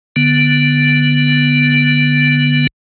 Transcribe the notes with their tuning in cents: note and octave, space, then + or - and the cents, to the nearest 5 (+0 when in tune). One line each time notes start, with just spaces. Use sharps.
D3 +0 B3 -10